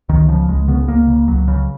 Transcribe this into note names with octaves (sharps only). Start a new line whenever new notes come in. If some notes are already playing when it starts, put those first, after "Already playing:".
C#2 D#3
C#3 F3
C#2 G#3
C#3 B3
C#2 A#3
C#3
C#2 F#3
C#3